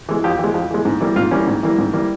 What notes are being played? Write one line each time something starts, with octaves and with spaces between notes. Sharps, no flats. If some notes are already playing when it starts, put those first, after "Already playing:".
E3 G#3
F2 G4
E3 G#3
F2
E3 G#3
G#2
E3 G3 A#3
G#2 F4
E3 G3 A#3 C#4
G#2
E3 G3 A#3
G#2
E3 G3 A#3